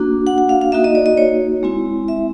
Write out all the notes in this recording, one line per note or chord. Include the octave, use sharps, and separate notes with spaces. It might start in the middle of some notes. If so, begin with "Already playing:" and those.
Already playing: A#3 D4 F#4
F#5
F#5
F5
F5
A#3 D#4 F#4 E5
D#5
D5
D#5
C#5
G#3 C4 E4
E5